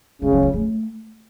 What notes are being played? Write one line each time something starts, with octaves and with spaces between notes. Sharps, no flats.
C#3 G#3
F#3
F3
A3